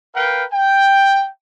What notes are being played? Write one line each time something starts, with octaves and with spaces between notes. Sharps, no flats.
A#4 B4 F5 G5
G5